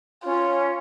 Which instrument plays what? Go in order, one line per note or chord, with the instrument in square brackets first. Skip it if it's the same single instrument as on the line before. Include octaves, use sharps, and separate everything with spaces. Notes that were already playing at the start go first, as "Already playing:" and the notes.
[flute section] C#4 [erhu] F4